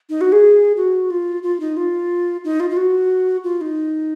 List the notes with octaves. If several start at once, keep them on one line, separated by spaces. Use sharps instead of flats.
D#4
F#4
G#4
F#4
F4
F4
D#4
F4
D#4
F4
F4
F#4
F4
D#4